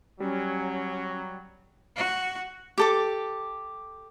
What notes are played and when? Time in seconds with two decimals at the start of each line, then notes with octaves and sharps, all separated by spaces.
0.20 F#3 G3 C#4
1.96 F#4
2.78 G4 A4 D6